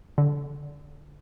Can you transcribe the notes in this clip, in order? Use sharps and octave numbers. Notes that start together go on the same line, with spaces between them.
D3